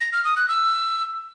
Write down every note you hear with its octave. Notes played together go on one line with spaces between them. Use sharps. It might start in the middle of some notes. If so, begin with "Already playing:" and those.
A#6
F6
D#6
F#6
E6